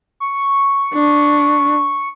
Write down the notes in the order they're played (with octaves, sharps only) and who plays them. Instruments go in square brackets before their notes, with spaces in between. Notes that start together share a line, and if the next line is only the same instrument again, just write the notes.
[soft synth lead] C#6
[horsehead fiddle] D4